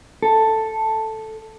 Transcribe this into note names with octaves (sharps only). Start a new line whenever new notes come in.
A4